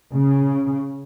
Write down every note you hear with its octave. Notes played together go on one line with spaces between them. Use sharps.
C#3